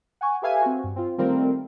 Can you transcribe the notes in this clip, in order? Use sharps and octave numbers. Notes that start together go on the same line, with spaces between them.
F#5 G#5 C#6
G4 A4 B4 E5 F5 G#5
C4 F#4
G2
C4 F4
D#3 G3 A3 C4 F4 A#4